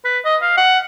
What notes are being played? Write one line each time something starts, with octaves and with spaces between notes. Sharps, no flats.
B4
D#5
F5
F#5